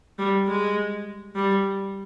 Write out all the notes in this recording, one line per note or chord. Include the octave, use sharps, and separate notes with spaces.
G3
G#3
G3